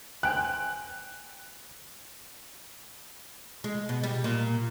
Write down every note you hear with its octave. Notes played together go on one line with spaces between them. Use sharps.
C5 G5 G#5 F#6
G#3
B2
G3
A#2